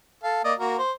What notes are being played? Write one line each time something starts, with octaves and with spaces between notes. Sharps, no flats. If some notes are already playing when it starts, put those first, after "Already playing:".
A4 F5
A#3 D5 D#5
A#3 F#4 A#4
C5